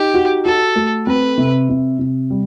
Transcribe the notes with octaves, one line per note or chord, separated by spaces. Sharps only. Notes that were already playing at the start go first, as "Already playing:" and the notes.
Already playing: D#4 G4
F#4
F#4 A4
A3
C4 B4
C3
C3
C3
G3